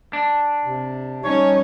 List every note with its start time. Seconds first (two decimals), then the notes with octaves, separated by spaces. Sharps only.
0.13 D4
0.65 C3
1.24 G3 C#4 D#4 C#5